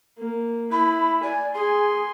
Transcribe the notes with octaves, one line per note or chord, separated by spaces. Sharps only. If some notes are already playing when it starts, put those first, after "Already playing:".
A#3
E4 B5
D5 G#5
G#4 G#5 C6